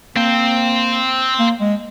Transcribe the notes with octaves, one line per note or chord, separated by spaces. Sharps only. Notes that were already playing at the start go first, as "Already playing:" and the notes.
A#3 C4
A#3
G#3